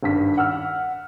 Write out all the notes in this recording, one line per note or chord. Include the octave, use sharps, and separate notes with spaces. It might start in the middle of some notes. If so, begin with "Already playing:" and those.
G#1 G2 B6
F#5 E6 F6